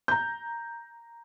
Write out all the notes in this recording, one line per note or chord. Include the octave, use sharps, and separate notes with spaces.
A#5 G6